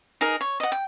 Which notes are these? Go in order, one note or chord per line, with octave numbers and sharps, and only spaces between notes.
D#4 G#4 A#4
C#5
D#5 F#5
G5